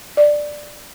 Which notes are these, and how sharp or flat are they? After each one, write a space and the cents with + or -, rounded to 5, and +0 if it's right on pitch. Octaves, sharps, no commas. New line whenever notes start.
D5 +10